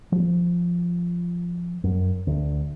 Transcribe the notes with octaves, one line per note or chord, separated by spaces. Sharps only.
F3
F#2
D2